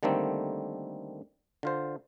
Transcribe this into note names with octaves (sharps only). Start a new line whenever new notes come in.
D3 D#3 G3 A3 A#3 C4
D3 F4 C5